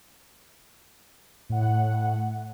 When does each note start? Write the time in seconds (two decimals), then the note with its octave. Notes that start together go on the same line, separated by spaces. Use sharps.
1.49 A2 F#5